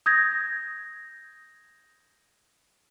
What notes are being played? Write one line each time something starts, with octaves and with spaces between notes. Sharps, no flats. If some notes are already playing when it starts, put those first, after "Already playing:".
D#6 G6 G#6 A#6